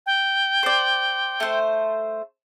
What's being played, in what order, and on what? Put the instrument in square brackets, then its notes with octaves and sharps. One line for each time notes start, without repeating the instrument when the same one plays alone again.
[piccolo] G5
[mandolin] C5 D5
A3 C5